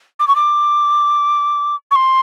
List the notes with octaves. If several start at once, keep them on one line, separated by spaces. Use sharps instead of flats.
D6
C#6
D6
C#6
C6